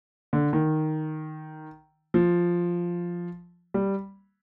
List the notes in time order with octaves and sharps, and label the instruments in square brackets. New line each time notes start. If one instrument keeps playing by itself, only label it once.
[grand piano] D3
D#3
F3
G3